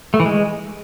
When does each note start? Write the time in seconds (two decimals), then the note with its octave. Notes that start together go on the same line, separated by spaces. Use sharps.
0.14 A3
0.20 E3
0.26 G#3